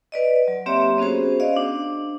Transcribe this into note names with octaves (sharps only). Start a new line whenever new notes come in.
B4 D5 D#5
F#3
A#3 C4 G4 C#5 E5
B3 C#4 F#4 G#4 C5
C5 D5 D#5 F5
D4